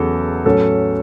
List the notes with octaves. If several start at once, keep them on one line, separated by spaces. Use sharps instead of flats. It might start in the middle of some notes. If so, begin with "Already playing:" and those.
Already playing: E2 C#3 F#3 A4
A2 F#3 C#4 A4